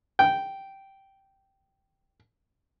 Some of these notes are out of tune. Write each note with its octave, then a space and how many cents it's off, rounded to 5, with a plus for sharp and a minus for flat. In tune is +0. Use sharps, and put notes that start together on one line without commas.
G5 -10